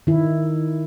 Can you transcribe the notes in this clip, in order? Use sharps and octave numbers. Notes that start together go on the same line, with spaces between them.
D#3 E4